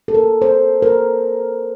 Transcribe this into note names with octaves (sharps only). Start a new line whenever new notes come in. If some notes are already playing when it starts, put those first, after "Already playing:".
A4
A#4
C5
A#4